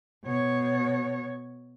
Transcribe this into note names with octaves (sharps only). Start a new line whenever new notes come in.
B2 C#5